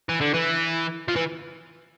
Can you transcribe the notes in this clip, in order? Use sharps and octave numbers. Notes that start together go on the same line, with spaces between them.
E3
D3
E3
F3
E3